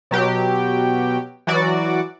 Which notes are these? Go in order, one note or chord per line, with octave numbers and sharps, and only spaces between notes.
B2 F#3 G4
E3 F#3 F#4 D5